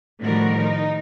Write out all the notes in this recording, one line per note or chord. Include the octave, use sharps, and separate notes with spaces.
A2 D#3 F3 G3 F#4 A#4
D#4